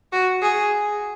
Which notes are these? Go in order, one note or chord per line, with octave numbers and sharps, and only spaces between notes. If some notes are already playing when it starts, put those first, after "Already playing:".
F#4
G#4